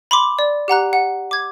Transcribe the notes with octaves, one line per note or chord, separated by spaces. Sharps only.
B5 C6 D6
D5
G4 F#5 A#5 F#6
F#5
D6 G#6